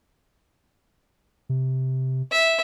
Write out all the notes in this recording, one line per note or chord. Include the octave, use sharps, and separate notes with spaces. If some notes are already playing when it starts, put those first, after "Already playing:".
C3
E5